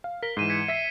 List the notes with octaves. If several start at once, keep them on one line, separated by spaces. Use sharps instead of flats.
F5
A#4 B6 G7
G#2 E3 C7 D#7 E7
G#6 B6 C#7
E5 B6 C7